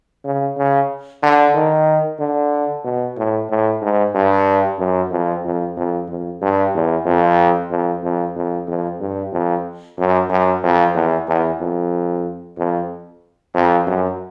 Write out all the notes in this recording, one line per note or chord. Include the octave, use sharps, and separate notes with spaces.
C#3
C#3
D3
D#3
D3
B2
A2
A2
G#2
G2
F#2
F2
F2
F2
F2
G2
E2
F2
F2
F2
F2
F2
G2
F2
F#2
F#2
F2
E2
E2
F2
F2
F2
F#2